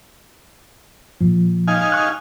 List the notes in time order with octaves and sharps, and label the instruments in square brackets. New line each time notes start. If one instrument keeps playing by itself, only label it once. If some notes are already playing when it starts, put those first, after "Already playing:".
[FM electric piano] A#2 F3
[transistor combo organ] D#4 F5 G#5
[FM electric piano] C#6 F#6